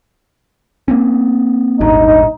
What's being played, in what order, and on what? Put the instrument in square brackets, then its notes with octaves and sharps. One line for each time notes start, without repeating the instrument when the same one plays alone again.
[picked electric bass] A#3 C4 C#4
[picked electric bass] D#1 G#1 G2 [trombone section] D#4